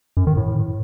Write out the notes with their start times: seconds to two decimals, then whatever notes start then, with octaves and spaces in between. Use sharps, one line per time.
0.17 F#2
0.27 D#3
0.37 A2